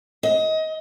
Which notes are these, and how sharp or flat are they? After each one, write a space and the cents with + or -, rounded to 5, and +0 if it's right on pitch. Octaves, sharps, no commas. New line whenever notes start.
D#5 +25